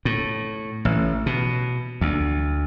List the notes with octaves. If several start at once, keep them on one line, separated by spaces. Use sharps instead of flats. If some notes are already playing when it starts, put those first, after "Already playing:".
A2
A1
B2
D2